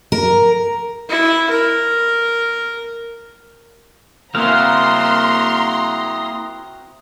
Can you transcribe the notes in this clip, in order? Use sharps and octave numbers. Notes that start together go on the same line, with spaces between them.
A#4
E4
A#4
A#3 C4 E4 F#4 F5 A#5 C6 D#6